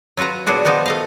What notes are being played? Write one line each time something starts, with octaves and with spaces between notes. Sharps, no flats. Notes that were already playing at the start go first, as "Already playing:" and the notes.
F#3 F4 F#4 B4 A#5
A#2 F#3 B3 D4 F#4 G#4
F3 B3 D#4 F#4 G4
A3 D#5 F5